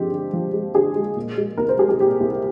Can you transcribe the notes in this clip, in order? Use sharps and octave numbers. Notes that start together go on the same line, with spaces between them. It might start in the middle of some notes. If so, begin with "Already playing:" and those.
Already playing: G2 F3 G#3 C4 D4 G4
D3
F3
G#3
D3 G#4
G#3
A#2
G#3
C2 A#4
C5
G#3 G#4
G#4
A#2 G4
C2